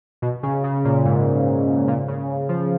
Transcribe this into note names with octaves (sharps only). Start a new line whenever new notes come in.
B2
C#3
C#3
A#2
G#2
A#2
C#3
F3